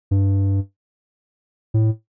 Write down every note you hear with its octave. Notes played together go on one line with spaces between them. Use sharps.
G2
A2